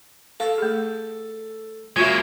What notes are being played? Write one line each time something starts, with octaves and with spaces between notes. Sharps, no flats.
A4 F5
A3 G#4
G#3 A#3 C#4 F4 F#4 E5